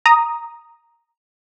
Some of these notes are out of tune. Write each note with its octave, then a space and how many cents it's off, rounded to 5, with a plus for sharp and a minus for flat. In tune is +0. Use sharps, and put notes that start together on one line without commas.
A#5 +0 D#6 +0